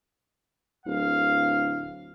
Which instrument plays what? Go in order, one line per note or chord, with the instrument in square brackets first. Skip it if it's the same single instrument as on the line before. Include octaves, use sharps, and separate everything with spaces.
[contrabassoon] D1 [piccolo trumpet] F5